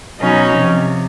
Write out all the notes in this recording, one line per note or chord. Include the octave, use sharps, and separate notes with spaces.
B2 F#3 C#4 D#4
C3 F3